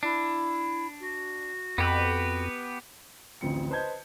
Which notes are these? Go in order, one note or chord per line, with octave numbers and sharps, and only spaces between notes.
D4 E4
F#4
F2 B3 G4 B4
A1 D2 F3 C4 C#7
B4 C5 D#5 A5 G6 G#6